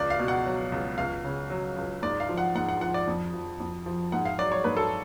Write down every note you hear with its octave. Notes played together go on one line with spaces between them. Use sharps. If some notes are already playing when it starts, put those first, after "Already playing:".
Already playing: C#2 D5
F5
B2
F#5
F#3
C#2
C#2 F5
C#3
F#3
C#2
G#2 D5
F5
F3
F#5
G#2 F#5
F#5
F3 F#5
D5
F2
F3
F2
F3
G#2 F#5
F5
F#3 D5
C#5
G#2 B4
A4